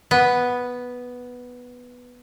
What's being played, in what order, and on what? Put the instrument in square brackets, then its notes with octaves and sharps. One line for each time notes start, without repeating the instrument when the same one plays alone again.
[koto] B3